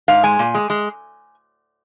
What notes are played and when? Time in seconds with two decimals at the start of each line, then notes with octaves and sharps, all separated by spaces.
0.08 G#2 F5
0.24 G#3 G#5
0.39 A#2
0.54 G#3
0.70 G#3